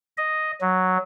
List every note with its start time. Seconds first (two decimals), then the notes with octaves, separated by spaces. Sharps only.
0.18 D#5
0.61 F#3